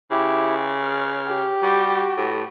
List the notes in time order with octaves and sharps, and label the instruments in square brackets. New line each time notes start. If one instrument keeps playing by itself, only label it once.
[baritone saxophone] C#3 [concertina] E4 G4
[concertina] F6
[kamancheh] G4
[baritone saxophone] G3 [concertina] F#4
[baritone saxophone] A2